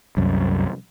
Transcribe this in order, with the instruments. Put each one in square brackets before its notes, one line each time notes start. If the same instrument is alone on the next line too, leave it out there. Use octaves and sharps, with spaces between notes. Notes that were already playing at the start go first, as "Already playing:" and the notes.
[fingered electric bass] C2 F#2